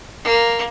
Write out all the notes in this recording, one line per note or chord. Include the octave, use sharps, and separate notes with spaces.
A#3